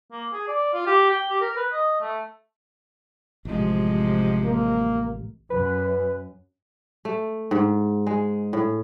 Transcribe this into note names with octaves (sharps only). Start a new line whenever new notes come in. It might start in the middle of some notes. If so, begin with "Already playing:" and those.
A#3
G#4
D5
F4
G4
G5
G4
A#4
B4
D#5
A3
A1 C3 F3 G#3
A#3
F#2 B4
A3
G#2
G#3
A2